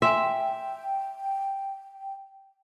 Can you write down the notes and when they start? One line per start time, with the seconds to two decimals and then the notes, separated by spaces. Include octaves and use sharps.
0.02 E5 G5 G#5 C6